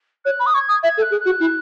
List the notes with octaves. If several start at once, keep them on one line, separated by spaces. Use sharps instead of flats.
C#5 F#6
B5
D#6
C#6 G#6
D#6
E5 G#6
A4
F#6
G#4
F#6
F#4
E4